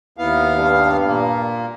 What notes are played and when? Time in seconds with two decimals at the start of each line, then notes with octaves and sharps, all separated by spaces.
0.18 D#2 B3 E4 F5
0.56 G2
1.06 A#2 A#3